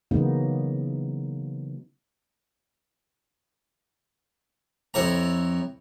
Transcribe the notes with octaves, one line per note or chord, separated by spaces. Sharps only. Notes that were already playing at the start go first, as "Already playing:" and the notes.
C#3 E3 F#3 A#3 B3 D#4
F2 E4 C#5 A#5